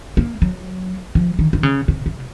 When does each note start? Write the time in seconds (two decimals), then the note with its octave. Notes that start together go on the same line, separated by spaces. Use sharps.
0.17 A#3
0.42 F#3
1.15 F3
1.39 D#3
1.53 D#3
1.63 C#3
1.88 C3
2.06 C3